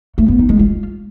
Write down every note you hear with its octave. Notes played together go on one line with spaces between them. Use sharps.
A3
B3
D#4
G#3
F4